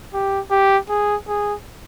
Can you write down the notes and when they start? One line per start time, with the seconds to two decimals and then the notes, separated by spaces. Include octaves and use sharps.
0.14 G4
0.51 G4
0.89 G#4
1.28 G#4